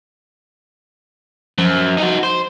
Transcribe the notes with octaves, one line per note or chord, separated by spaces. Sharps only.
F#2 F3
D#4 F#4
C5